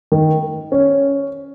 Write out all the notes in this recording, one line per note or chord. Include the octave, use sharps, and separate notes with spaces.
D#3
C#4